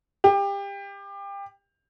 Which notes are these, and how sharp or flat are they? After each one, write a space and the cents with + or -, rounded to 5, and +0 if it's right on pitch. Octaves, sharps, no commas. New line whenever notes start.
G4 +25